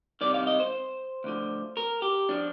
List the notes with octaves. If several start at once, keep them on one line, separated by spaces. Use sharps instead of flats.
C2 C3 D#3 D5
F5
D#5
C5
D2 D3 F3
A#4
G4
F3 D4